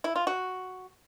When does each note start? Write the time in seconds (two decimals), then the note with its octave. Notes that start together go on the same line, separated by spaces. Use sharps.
0.04 E4
0.16 F4
0.27 F#4